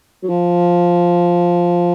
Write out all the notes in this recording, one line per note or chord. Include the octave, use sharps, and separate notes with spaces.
F#3
F3